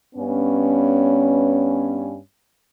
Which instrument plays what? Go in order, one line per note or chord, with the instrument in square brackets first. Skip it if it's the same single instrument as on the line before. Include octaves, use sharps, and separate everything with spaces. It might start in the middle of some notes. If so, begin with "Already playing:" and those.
[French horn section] G2 B3 C#4